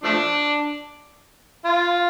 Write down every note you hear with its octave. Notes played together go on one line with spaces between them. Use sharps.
F3 A3 D4
F4